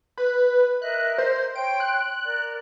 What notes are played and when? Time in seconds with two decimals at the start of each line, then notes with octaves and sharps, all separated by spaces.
0.18 B4
0.82 A#4 D#5 E5 F#6
1.18 C5
1.55 C#5 G5 C6 D7
1.80 F#6
2.24 A#4 D5